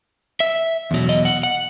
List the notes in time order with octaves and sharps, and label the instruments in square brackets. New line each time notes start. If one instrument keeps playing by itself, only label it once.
[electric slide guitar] E5
E2 B2 F#3
D#5
F#5
F#5